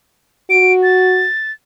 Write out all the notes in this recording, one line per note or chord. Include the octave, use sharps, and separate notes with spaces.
F#4 D7
A6